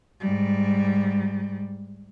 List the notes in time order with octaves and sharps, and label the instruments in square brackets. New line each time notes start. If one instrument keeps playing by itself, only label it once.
[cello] G#2 G3